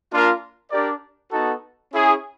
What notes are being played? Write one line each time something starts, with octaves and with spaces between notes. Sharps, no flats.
A#3 D4 F4 A#4
D4 G4 A#4 D5
B3 D#4 F#4 A4
C#4 E4 G#4